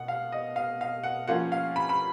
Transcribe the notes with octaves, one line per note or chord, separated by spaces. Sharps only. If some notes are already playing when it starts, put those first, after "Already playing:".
Already playing: B2 B3 F#5
F5
D#5
F5
F5
F#5
F3 A#3 C#4 F4 F#5
F5
B5
B5